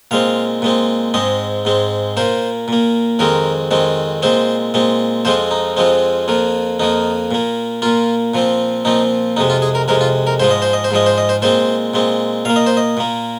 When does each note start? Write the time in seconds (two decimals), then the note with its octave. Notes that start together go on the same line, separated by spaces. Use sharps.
0.11 A#2 G#3 C4 F5
0.62 A#2 G#3 C4
1.14 G#2 G#3 C4 D#5
1.65 G#2 G#3 C4
2.17 A#2 A#3 C5
2.68 A#2 A#3
3.19 F2 D#3 G#3 C4 A#4
3.71 F2 D#3 G#3 C4
4.22 A#2 G#3 C4 C5
4.74 A#2 G#3 C4
5.25 F2 F3 G#3 C4 C5
5.51 D#4
5.77 F2 F3 G#3 C4
6.28 F2 F3 A#3
6.80 F2 F3 A#3 D#4
7.31 A#2 A#3
7.82 A#2 A#3 F4
8.34 A#2 F3 C4
8.85 A#2 F3 C4 D#4
9.37 F2 C3 G#3 D#4
9.50 F4
9.62 G#4
9.75 A#4
9.88 F2 C3 G#3 A#4
10.01 F4
10.27 A#4
10.39 G#2 F3 G#3 C5
10.51 D#5
10.62 C5
10.73 D#5
10.84 C5
10.91 G#2 F3 G#3 D#5
11.06 C5
11.18 D#5
11.29 C5
11.42 A#2 G#3 C4 C5
11.94 A#2 G#3 C4
12.45 A#2 A#3 F5
12.56 D#5
12.67 C5
12.77 D#5
12.97 A#2 A#3